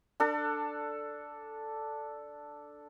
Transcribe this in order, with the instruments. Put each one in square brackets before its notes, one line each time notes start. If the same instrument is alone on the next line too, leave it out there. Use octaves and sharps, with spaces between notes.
[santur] D4 A4